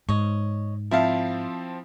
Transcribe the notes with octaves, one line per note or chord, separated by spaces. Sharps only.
G#2 C#5 D#5
F3 C4 E4 F5 A5